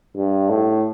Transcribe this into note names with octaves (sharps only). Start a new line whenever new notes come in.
G2
A2